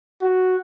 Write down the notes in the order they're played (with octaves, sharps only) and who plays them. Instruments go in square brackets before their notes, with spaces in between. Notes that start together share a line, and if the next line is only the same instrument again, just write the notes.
[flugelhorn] F#4